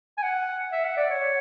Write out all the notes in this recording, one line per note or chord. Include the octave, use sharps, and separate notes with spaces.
G#5
F#5
E5
F#5
D5
C#5